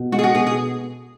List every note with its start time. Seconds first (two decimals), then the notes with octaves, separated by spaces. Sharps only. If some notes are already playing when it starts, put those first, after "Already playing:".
Already playing: B2
0.12 G#3 F#4
0.19 G#4
0.24 F#4
0.35 B2 G#4
0.46 G#4